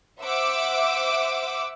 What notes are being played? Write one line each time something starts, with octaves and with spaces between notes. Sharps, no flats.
C5 E5 F#5 D6 E6